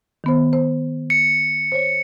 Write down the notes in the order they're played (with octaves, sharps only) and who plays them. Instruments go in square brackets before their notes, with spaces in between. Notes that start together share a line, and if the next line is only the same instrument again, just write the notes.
[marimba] D#3 B3 C5
C5
[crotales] C#7
[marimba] C5 C#5